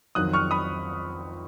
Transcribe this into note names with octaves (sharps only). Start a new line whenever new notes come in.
F2 D#3 F#3 D#6 F#6
C#6 F6
B5 D#6